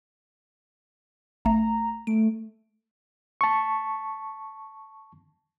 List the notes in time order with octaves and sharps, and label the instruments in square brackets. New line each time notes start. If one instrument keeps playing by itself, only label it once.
[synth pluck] A1 A3 [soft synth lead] A#5
[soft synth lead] A3 [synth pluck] D7
[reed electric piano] A5 C#6